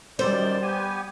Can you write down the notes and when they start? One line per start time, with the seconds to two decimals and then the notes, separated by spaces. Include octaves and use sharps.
0.19 F#2 D#3 G3 C5 D5
0.62 B3 G4 G#5